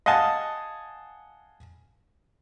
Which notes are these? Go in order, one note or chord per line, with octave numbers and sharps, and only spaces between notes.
D#5 F5 F#5 G#5 A5